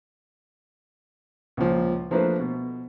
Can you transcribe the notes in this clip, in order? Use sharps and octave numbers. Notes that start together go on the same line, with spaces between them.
C#2 A#2 F3
F3 A3 A#3 D4 B4 C5
B2